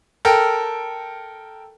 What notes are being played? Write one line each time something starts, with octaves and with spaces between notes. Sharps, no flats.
A4 A#4 G5